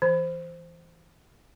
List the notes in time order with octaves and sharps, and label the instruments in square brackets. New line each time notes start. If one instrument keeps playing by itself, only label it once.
[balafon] E3